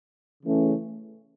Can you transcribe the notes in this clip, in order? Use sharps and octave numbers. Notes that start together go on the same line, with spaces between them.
C#3 E3 A3 C#4